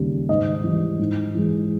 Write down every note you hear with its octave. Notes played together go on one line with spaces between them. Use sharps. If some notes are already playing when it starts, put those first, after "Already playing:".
Already playing: D#2 C#3 G3
G#2 D#5
E3 G3
G#2
E3 G#3